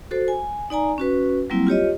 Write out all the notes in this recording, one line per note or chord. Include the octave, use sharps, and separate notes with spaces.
F#4 A4 C5
G#5
D#4 D5 G#5 A#5
C#4 F#4 B4
F#3 G3 A#3 C4 E4
F4 G4 C#5 D#5